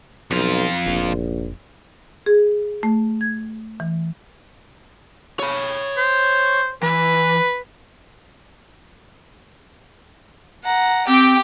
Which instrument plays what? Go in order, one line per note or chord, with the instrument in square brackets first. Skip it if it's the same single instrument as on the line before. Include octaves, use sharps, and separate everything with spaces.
[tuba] B1 [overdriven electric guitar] F2 F4
[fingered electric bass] F1 [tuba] A#1
[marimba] G#4
A3
G#6
E3
[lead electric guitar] C#5 B5
[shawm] C5
[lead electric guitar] E3 [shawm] B4
[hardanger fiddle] F#5 A#5
[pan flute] C4 [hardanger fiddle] G4 G5